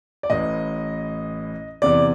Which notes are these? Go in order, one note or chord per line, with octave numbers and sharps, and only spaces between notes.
D5
A1 A2 E3 D#5
E2 C3 E3 D5